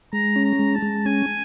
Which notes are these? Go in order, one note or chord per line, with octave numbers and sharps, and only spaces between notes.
G#3 A#5
C#4
A#5
G#3
A5
G#3
C#4 G#5